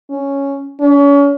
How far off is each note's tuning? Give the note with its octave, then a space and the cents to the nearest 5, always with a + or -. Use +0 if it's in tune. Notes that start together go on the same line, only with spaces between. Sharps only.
C#4 +0
C#4 +35